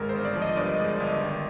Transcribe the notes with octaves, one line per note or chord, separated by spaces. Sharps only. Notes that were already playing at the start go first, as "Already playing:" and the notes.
Already playing: G#1 G#3 A#4
C5
G1
D5
F3
D#5
G2 D5
G#3
G1
D#3